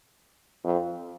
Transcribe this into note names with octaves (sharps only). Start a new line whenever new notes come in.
F2